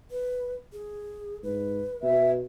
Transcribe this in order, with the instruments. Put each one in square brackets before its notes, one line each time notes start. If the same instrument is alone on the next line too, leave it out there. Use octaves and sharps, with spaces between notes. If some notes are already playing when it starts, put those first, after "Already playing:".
[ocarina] B4
G#4
[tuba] G#2 [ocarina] B4
[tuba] B2 [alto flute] E5